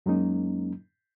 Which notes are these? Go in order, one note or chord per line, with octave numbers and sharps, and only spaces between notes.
F#2 F#3 G#3 A#3 C#4 D#4